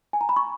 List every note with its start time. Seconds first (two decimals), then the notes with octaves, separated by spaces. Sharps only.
0.13 G#5
0.21 A#5
0.29 B5
0.36 C#6